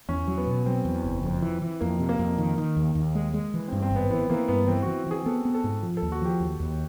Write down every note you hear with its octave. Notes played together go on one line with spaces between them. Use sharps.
E2 C#4
F#3
B3
B2
F#3 C4
E2
F#1
F2
E3
E3
F2 A#3
C3
A#3
F2
D#3
D#3
D#2
D#2
G#3
G#3
E3
G2 C4
C4
G#1
B3
E3 B3
E3 A#3
G2 B3
E3 C4
E3 F#4
E3 G#4
B3 A4
B3
A4
G#2
F3
A4
D#2
F#4
F3 G4
D#2
D#2